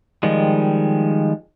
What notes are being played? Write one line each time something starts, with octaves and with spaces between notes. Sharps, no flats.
D#3 F3 G3 G#3